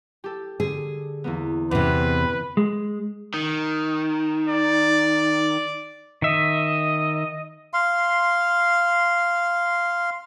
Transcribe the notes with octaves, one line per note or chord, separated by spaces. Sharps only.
G4 A4
D3 G#4
E2 A#3 B3
E2 C3 B4 D6
G#3
D#3
D5
D#3 D#5 E5
F5 C6